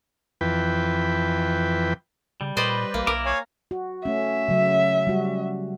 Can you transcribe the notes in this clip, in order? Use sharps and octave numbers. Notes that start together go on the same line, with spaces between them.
F2 E3 B4 G5
C#3 G3
A#2 B4 C5 D5 D#5
A#1 A#3
B1 E4 A#4 D6
C#5 F5 G#5
F#4
A3 C#4 E5
C#3 F#3
G3 F#4